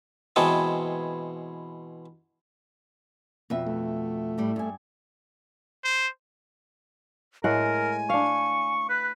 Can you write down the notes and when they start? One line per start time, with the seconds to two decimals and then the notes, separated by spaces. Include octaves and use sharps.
0.36 B2 E3 G#3 C4 C#5 A5
3.50 F2 B2 E5
3.67 A3
4.38 A2 G3
4.56 G2 G#5
5.84 C5
7.44 A2 G#3 A#4 F#5 G#5
8.10 D4 F5 C#6
8.89 B4 F#6